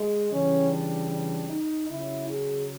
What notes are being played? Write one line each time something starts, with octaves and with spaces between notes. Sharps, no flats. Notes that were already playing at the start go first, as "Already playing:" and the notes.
Already playing: G#3
C#3 E3 G3 C#4
D4
D4
D#4
C#3 F#3 E4
G#4